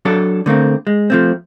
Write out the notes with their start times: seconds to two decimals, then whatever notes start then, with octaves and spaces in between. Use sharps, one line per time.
0.05 F#3 D4 A4
0.46 D3 A3 A#3 C4
0.87 G#3
1.10 F3 A3 C4